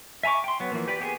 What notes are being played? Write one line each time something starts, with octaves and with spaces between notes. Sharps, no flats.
E5 G#5 A#5 C#6 D6
G5 C6
F#3 B3
E3 F3 A#3
G4 B4 D5
B3 G4 G#4